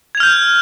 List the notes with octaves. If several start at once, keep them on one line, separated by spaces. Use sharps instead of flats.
F6 G6 G#6 F7